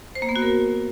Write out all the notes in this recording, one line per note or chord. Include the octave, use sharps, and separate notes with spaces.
C5
A#3
B3
F#4
A#4